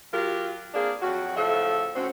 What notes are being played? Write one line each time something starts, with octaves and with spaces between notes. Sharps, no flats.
F#3 F4 G4 A#4
A#3 C4 D4 G#4
F2 F#3 F#4
A2 C#3 F3 A4 E5
D2 A2 C4 C#4 F#4